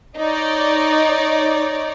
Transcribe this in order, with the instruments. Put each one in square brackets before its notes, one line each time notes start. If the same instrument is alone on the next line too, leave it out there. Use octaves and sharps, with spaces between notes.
[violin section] D#4 C#5 D5